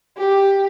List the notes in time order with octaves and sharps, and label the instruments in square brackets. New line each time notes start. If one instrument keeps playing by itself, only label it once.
[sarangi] G4